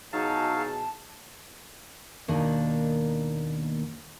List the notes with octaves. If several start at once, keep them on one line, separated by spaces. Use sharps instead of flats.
B2 F#3 D#4 E4 G#4 F5 A5
D#2 B2 D#3 A#3 D4